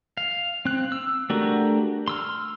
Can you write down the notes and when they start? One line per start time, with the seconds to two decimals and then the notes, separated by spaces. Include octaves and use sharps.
0.17 F5
0.65 C4 F#6
0.92 E6
1.30 A3 D4 F#4 G4 A#4
2.08 C6 E6 F6